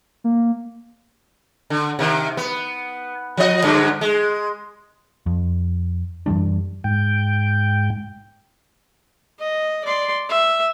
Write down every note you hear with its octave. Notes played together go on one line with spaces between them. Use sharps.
A#3
D3
C3 D#3
B3
F3 D#5
G2 D3 F#3
G#3
F2
F#2 E3 G3 D4
G#2 G5
D#5
D5 C6
E5